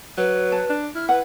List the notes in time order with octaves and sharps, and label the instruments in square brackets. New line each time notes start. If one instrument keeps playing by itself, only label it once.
[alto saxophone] F#3 [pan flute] B4
[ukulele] A5
[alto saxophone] D4
[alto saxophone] E4 [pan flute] F6
[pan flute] B4 [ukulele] F#5